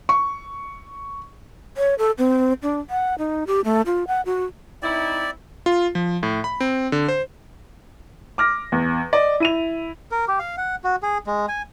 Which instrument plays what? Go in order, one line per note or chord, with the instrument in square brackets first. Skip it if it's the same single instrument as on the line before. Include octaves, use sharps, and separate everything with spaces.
[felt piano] C#6
[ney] C#5
A4
C4
D4
F#5
D#4
G4
A3
F4
F#5
F#4
[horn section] C4 D#4 E4 [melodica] D5
[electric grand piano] F4
F3
A2
B5
C4
D3
C5
[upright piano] D6 F6 A#6
E2
D5 D#5
E4 D#7 F7
[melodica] A#4
G4
F5
F#5
F#4
G#4
G#3
G#5